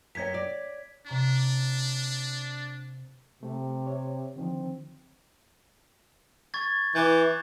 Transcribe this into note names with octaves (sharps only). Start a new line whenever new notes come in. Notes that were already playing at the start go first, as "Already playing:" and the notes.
F#2 C#4 C#5 G#6 B6
D5
C3 D4 A#5 C#6
C3 A3
C#5
D3 D#3 F3 C4
C#6 G#6 A6
E3 D6 F#6 G6